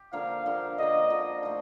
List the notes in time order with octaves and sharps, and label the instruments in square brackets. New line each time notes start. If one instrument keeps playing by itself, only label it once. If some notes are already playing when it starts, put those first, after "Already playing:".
Already playing: [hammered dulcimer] G4
[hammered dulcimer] D3 F3 A#3 [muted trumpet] F5
[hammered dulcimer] D3 F3 A#3
[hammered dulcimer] D3 F3 A#3 [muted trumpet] D#5
[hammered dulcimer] D3 F3 A#3
F3 A3 D#4